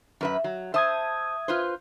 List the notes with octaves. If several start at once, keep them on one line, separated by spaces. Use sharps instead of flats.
F#2 B4 E5
F#3
C5 E5 A5 D#6 G#6
F4 B4 C5